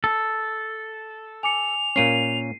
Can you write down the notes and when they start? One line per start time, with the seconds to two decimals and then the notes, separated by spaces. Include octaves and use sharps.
0.04 A4
1.43 G#5 D6 C#7 F7
1.96 A#2 A#3 C#4 C7 D#7